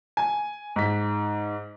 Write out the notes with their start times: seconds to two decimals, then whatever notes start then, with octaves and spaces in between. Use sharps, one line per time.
0.17 G#5
0.76 G#2 B6